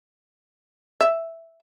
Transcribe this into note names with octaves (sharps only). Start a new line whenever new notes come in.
E5